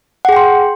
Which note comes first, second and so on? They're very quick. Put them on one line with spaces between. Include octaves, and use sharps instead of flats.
F#5 G#4 G5 C6